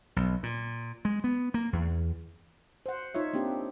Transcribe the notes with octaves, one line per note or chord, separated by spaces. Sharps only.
B1
A#2
G#3
B3
A#3
E2
C5 F#5
D#4 F4 C#5 E5
A#3 C4 D4 G4